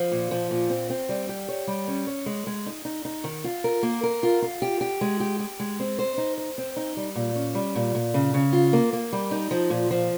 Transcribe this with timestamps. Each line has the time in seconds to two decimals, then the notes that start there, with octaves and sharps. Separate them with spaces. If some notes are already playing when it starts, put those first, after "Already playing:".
Already playing: F3
0.12 A#2
0.31 F3
0.51 A#2
0.69 C4
0.90 C4
1.09 G3
1.29 G4
1.49 C#5
1.67 G3
1.88 C#4
2.07 C#5
2.26 G#3
2.47 G#3
2.66 D#4
2.85 D#4
3.05 D#4
3.24 D#3
3.44 F4
3.64 A#4
3.83 A#3
4.03 A#4
4.23 F4
4.42 F4
4.62 G4
4.81 G4
5.01 G#3
5.20 G4
5.39 G4
5.60 G#3
5.80 C4
5.99 C5
6.18 D#4
6.38 C5
6.58 C4
6.76 D#4
6.97 G3
7.16 A#2
7.35 C#4
7.55 G3
7.75 A#2
7.95 A#2
8.14 C#3
8.34 C#3
8.53 F4
8.73 A#3
8.93 A#3
9.13 G3
9.31 D#4
9.51 F3
9.70 A#2
9.91 F3